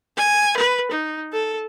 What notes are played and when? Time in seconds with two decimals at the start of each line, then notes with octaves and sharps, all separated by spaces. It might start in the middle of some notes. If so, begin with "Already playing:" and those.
0.17 G#5
0.57 B4
0.91 D#4
1.33 A4